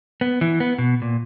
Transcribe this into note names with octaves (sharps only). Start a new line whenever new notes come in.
B3
E3
B3
B2
A#2